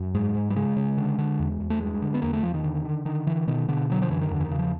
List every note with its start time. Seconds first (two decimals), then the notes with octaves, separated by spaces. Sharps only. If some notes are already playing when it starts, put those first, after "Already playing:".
Already playing: F#2
0.14 G#2 G#3
0.35 G#2
0.50 G3
0.56 C#3 G#3
0.77 C#3
0.97 D3
1.18 D3
1.40 E2
1.60 E2
1.70 A3
1.81 G2 G#3
2.02 D3
2.14 B3
2.22 E2 A#3
2.33 A3
2.43 E2 F3
2.54 D#3
2.64 D3
2.85 D3
3.05 D3 D#3
3.27 D3 E3
3.47 B2 D#3
3.68 B2 D3
3.90 D3 F#3
4.02 F3
4.10 F#2 E3
4.21 D#3
4.30 E2 D3
4.40 E3
4.44 D#3
4.51 C#3
4.59 F3